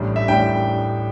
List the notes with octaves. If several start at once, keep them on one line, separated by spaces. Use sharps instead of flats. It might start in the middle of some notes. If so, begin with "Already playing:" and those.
Already playing: A1 A2 G3 D4
E5
A1 A2 G3 D4 G5